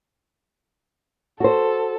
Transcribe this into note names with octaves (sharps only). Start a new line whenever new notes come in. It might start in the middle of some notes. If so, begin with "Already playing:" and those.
F#4 A4 C5